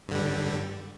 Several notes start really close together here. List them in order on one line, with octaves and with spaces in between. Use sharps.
G2 D3 G3